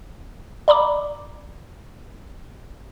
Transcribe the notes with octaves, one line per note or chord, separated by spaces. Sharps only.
D5 A#5 B5 D6